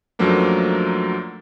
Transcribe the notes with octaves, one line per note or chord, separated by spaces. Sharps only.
F#2 F3 F#3 A3 A#3 D4